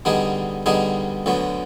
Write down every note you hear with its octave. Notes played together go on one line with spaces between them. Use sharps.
D3 G3 B3 D#4 G#4
D3 G3 B3 D#4 G#4
D2 D3 F#3 B3